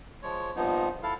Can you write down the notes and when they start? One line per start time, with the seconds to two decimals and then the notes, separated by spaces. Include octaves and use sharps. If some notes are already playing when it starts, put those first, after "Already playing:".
0.23 F3 G#3 C#5
0.56 G2 A#2 F3 B3 D#4
1.03 E4 A4 F5